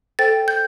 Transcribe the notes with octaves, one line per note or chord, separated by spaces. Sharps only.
A4 C5 G5 A6
G6